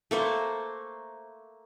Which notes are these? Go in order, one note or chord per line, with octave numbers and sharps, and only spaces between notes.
A3 A#3 C5